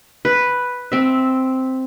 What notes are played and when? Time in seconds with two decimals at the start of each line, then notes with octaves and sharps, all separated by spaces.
0.25 B4
0.92 C4 E5